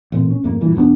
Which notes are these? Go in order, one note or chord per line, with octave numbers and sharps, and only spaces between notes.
A1 A#2 C4
C#4
G#1 F2 G#2 A#3
G2 A#2 E3
E1 G2 B3 D4